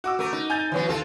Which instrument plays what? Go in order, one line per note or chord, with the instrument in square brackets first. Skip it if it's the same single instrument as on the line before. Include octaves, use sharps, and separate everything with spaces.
[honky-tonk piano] F#4 D6 E6
[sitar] A3 A#4
D#4
[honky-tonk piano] G#5 G6 A6
[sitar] E3 F#3 B3
[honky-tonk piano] D#2 [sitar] F4 A4